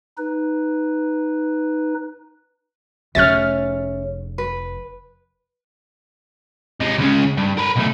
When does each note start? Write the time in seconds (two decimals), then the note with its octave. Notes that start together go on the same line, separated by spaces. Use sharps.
0.18 D#4 B4
3.15 F1 F3 C#4 G#4 E5 F6 A6
4.38 B4
6.81 C3 G#3
6.98 C#2 C#3
7.37 G2
7.57 A#4 B4
7.76 B1 A3